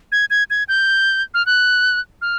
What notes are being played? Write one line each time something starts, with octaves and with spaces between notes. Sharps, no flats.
G#6
G#6
G#6
G6
F6
F#6
F6